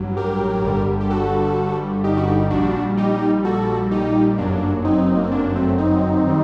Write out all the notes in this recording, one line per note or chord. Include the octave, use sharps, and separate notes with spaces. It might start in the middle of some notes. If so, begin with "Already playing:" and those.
Already playing: A1 G2 F#3
G4 A#4
G1 G2 D3 G3
G4
F#4 A4
D#4 G4
F#4
D#4 G4
A#1 A#2 G3 D4 F#4
D#4 G4
F#4 A4
D#4 G4
G1 F#2 F#3 A#3 D4
C4 D#4
A#3
C4
A#3 D4
D4
A3 C4
C4 D#4
D#3 G3